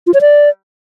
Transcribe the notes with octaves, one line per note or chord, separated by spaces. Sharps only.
F4
C#5
D5